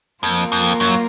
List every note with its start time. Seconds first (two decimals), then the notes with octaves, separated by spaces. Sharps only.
0.23 F2 A#3 F4 A#4
0.52 F2
0.80 F#2